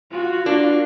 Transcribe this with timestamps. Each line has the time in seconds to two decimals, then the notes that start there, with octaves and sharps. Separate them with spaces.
0.11 F4 F#4
0.46 A#3 D4